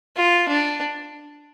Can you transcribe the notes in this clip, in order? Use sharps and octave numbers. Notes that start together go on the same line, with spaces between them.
F4
D4